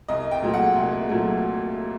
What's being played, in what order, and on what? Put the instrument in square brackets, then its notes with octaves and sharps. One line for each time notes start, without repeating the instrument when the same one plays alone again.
[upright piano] C2 D#5
G5
A#2 F#3 A3
F#5
C2
A#2 F#3 A3